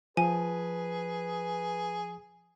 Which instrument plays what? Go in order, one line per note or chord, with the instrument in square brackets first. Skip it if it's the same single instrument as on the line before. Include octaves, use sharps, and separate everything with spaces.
[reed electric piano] F3 [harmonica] G#4 [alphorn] B4 [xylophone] G#5